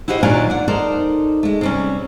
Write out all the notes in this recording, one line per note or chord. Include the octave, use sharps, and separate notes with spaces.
E4 F#4 G4 C5 D#5
D#2 A#2 F#3 D4 F5 G#5
D5 F#5
D#4 A4 A#4 C5 D5
G#3 A3
C3 G3 C#4